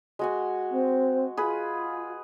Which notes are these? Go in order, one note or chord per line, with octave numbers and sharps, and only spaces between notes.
G#3 F#4 G#5
C4
F4 G#4 B4